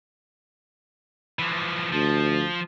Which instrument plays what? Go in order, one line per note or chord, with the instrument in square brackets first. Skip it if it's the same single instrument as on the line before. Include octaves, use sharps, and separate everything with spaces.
[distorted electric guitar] E3 F3
[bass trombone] D2 [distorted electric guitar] F3